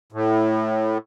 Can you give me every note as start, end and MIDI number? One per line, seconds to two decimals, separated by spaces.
0.12 0.98 45